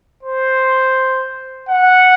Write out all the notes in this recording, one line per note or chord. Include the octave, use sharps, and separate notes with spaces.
C5
F#5